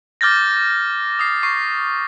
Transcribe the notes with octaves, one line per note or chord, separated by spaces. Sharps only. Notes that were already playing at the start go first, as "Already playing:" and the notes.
D6 F6 G6 A6 A#6
D#6 C7
C#6 C7